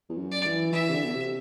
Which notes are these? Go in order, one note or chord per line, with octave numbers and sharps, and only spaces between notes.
E2
F#2
D5
E3
E3 E5
C3
D3
B2
C3